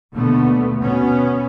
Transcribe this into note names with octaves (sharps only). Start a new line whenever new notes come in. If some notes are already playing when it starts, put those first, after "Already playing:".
D#2 B2 D3 A3 B3
B2 B3 C#4